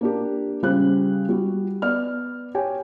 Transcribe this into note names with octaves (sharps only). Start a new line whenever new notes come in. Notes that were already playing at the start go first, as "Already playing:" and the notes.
A#3 D4 G4
C#3 G3 G4 C5 F#6
G3 F#4
B3 D5 F6
G4 C#5 G5 G#5